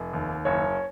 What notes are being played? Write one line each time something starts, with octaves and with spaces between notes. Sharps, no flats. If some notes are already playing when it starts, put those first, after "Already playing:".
Already playing: F1
D#2
F#1 C#5